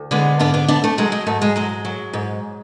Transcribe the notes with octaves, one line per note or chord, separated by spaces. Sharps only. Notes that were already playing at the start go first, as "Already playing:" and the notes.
Already playing: D2
D3 G#3 B3
G#2 B3 D4
B3 D4
G#2 B3 D4
A3
F#3 G#3
G#3
G#2 A3
G#3
F#3 G#3
F#3
G#2